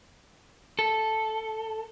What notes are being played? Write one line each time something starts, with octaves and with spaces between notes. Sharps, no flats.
A4